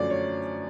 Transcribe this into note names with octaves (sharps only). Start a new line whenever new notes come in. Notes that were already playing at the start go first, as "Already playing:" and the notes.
Already playing: F#2 D3 F3 A3 C#4 F#4 D5
C#5